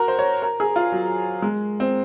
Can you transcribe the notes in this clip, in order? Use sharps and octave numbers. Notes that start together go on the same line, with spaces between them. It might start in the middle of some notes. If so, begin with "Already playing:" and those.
Already playing: F#4 A#4
C5
C#5
A#4
G#4
F4
F#3
G#3
C4